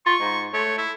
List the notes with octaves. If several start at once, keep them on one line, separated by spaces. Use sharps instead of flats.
F4 C#6
G#2
A3 C#5
E4